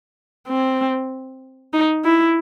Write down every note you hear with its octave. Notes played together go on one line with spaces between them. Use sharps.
C4
D#4
E4